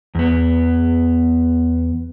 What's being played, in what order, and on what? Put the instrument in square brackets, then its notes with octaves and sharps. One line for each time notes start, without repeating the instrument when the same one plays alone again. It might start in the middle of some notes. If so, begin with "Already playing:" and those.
[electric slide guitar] E2 B3